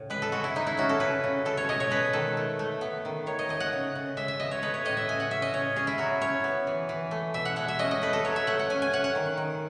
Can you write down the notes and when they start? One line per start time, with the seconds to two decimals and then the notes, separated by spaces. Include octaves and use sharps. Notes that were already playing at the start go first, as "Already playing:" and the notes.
Already playing: A2 C#3
0.10 G#3 B4
0.22 A4
0.32 G#3 F#4
0.44 E4
0.55 G#3 D#4
0.67 E4
0.77 C#4 F#4
0.89 A4
1.00 C#3 B4
1.24 C#3
1.45 G#3 A4
1.57 C#5
1.69 B2 D#5
1.80 C#5
1.91 G#3 B4
2.13 D#3 A4
2.37 A3
2.59 A3
2.81 B3
3.05 D#3
3.26 D#3 C#5
3.39 D#5
3.49 A3 D#5
3.60 F#5
3.73 C#3
3.95 C#3
4.17 G#3 E5
4.28 E5
4.39 B3 D#5
4.51 C#5
4.62 A3 B4
4.74 C#5
4.85 A2 D#5
4.97 E5
5.08 C#3 G#5
5.20 F#5
5.31 C#4 E5
5.42 D#5
5.53 C#4 C#5
5.76 C#4 G#4
5.87 E4
5.98 F#3 F#4
6.21 C#4 C#5
6.44 B3
6.67 E3
6.89 E3
7.11 A3
7.34 B2 E5
7.45 F#5
7.56 G#3 F#5
7.68 E5
7.79 C#4 D#5
7.91 D#5
8.02 A3 B4
8.13 A4
8.24 F#3 C#5
8.36 E5
8.47 A3 F#5
8.59 F#5
8.70 C#4 G#5
8.82 G#5
8.93 C#4 F#5
9.04 F#5
9.15 D#3
9.37 D#3